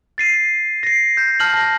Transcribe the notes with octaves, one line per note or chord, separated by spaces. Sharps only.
A6 C7 D#7
A#6 C7
G6
A5 F6 G6 F#7
A5 A#6